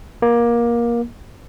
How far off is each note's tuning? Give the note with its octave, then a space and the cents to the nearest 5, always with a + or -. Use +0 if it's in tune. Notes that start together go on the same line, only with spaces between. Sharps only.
A#3 +20